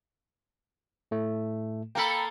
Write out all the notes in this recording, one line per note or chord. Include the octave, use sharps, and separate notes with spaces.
A2 A3
A#3 A4 G5 B5